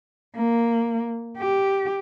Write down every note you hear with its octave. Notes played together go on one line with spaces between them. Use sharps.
A#3
G4